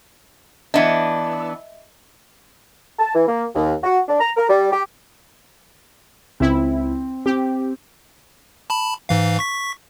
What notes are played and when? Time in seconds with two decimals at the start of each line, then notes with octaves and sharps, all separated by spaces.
0.74 E3 B3 D4 D#5 E5
2.99 A5
3.15 E3
3.28 A#3
3.55 D#2
3.84 F#4
4.09 D4
4.20 A#5
4.36 A#4
4.50 G3
4.72 G4
6.40 C#2 C4 E4
7.26 C4 G4
8.70 A5 B5
9.09 G#2 E3 F5
9.39 C#6 B6